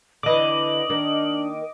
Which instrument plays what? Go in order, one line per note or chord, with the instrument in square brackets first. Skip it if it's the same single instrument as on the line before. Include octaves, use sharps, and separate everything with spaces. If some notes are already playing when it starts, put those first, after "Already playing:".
[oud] D3 E3 [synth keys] D#5 D6 [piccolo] F#7
[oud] D#3 A#3 [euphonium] D4